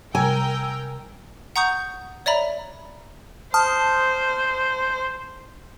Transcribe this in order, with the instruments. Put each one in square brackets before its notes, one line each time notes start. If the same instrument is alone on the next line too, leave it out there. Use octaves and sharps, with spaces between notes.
[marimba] C3 G3 [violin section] A#4 G5 [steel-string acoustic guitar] G#5 [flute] E6
[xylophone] F#5 A#5 C#6 D#6 G6
C#5 D5 E5 A#5 B5
[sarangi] C5 [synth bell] A5 D#6 F6